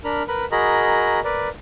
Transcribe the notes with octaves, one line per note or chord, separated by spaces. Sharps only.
D4 A#4 B5 F6
A#4 B4 B5
F#4 G#4 A#4 D#5 A#5 B5
A#4 B4 D5